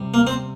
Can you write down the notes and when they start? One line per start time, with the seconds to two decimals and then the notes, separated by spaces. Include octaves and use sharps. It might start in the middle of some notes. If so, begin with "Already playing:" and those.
Already playing: C3 G3
0.14 A#3
0.27 C4